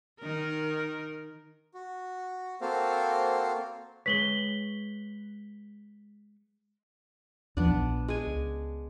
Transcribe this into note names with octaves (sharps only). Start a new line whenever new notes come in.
D#3 A#4
F#4
A#3 C4 F#4 A4 C5 F5
G#3 B4 C#5 B6 F#7 G7
D#2 F3 B3 D4
A#1
G#3 G#5
C#2